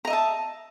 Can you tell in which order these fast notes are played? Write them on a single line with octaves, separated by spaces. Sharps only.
A#5 D#5 E5 A5